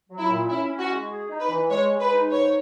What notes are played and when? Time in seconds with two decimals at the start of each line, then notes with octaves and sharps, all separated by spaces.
0.10 F#3
0.19 E4
0.29 A#2
0.49 C#4 E4
0.69 C#4
0.79 F#4
0.90 G#3
1.09 G#4
1.30 D#4
1.40 B4
1.50 E3
1.70 G#3 C#5
1.90 G#3
2.00 B4
2.10 D#4
2.30 G#2 C#5